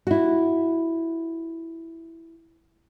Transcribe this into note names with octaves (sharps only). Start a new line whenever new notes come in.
E4 F#4